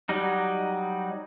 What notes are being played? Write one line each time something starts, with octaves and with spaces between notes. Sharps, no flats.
F#3 G3 D#4